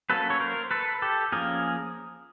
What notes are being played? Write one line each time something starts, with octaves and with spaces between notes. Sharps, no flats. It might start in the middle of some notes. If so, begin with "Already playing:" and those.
F#3 A#3 C#4 A4 B4
C#5
A#4 C5
A4 B4
G4 A4
F3 A#3 C#4 G#4 A#4